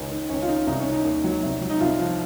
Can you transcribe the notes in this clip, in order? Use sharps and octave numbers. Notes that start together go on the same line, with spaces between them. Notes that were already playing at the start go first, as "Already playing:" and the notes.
Already playing: C#2 D#3 C#4
D#3
C#2 C#4
F4
D#3 D#4
C2 D#4
C#4
D#3
D#4
D#2
F#3
C2
F#3
D#4
C2 F4
F3